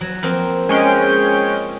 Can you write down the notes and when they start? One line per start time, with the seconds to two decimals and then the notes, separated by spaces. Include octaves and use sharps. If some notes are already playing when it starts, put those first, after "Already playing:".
0.01 F#3
0.23 F3 A#3 C4
0.69 G#3 C#4 G5